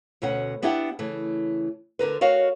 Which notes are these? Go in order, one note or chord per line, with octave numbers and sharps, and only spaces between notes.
D2 B2 C#4 F#5
B3 D4 E4 G4 E5 F#5
C#3 E3 A3
D2 D3 A#4 B4
F#4 A#4 C#5 D#5 F5